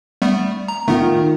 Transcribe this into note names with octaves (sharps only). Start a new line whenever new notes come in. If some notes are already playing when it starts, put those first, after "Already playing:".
G3 A3 B3
A#5
D#3 A3 B3 F4